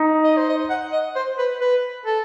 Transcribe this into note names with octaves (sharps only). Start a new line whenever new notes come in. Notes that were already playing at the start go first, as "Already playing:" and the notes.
Already playing: D#4
D#5
C5
D#5
F#5
D#5
C5
B4
B4
A4